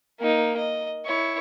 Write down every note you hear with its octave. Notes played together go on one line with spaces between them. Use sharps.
A#3 D#4
D#5
E4 C#5